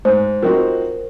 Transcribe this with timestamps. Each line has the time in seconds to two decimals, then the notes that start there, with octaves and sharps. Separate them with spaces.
0.05 G#2 C5
0.43 F3 C4 D#4 F#4 A#4